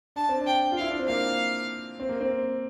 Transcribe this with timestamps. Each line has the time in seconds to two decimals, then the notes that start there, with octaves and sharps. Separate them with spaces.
0.16 D4 A5
0.29 C4
0.41 D4
0.47 G5
0.72 F4
0.77 E4 F5
0.90 D4
1.00 C4
1.07 A#3 F5
2.00 C4
2.09 A#3
2.21 C4